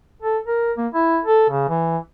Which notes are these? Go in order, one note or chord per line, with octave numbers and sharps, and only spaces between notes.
A4
A#4
A#3
E4
A4
C#3
E3